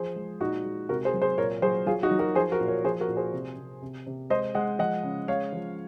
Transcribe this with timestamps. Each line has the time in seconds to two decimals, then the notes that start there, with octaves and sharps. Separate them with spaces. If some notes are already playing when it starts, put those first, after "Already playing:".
Already playing: F3 G#4 C5
0.16 G#3
0.40 A#2 D#4 F#4
0.64 G#3
0.89 C3 F#4 A#4
1.05 G#4 C5
1.13 F#3
1.22 G#4 C5
1.37 A#2 A#4 C#5
1.62 F#3 G#4 C5
1.86 F#3 F4 G#4
2.03 D#4 F#4
2.11 F#3
2.19 F#4 A#4
2.35 F3 G#4 C5
2.52 F#4 A#4
2.60 A#2
2.68 A#4 C#5
2.84 F3 G#4 C5
3.00 F#4 A#4
3.08 A#2
3.17 G#4 C5
3.33 C3
3.57 C3
3.82 C3
4.07 C3
4.30 G#3 C5 D#5
4.55 G#3 D#5 F#5
4.79 F3 D#5 F#5
5.03 C#3
5.28 G#3 C#5 F5
5.53 F3